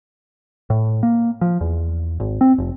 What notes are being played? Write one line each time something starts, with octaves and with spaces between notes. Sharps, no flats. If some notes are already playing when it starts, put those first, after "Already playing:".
A2
A#3
F3
E2
G#1
C4
F1